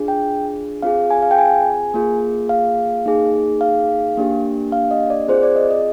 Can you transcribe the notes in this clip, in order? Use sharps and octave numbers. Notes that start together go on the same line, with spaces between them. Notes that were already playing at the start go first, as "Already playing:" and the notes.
Already playing: D4 F4 G#4
G5
C4 F4 G#4 F5
G#5
F5
G5
G#5
A#3 F4 G#4
F5
A#3 D#4 G#4
F5
A#3 D4 G4
F5
D#5
D5
C4 F4 G#4 C5
D5
D#5
D#5